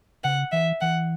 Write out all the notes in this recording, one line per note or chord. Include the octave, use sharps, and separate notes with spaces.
C#3 F#5
E3 E5
E3 F#5